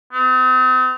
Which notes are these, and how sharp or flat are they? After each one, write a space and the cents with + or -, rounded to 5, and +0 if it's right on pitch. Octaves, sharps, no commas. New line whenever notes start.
C4 -45